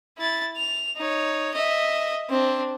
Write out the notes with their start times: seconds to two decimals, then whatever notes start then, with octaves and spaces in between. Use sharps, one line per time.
0.18 E4 A6
0.56 F7
0.97 D#4 C#5
1.54 D#5 E5
2.29 C4 D4